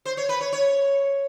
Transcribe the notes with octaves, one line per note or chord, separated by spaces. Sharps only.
C5
C#5
B4
C#5
C#5